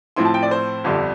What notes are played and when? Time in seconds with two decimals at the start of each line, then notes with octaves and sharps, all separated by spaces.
0.16 A2 F3 C4 E4 C6
0.25 A5
0.34 G5
0.42 D5
0.51 C5
0.84 G1 F2 D3 G3